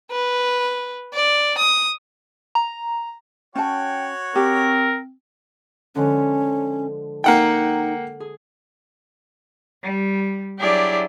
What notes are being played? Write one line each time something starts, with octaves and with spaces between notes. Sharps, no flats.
B4
D5
D#6
A#5
C#4 F#4 C#5 G5 A5
C4 G4 A#4
D3 F3 G#3 C#4
A#3 D#4 F#5 G5
G#4
G3
F#3 D4 E4 G4 G#4 D5